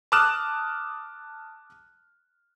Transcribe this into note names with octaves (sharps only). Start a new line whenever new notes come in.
A5 D6 D#6 F6 F#6 E7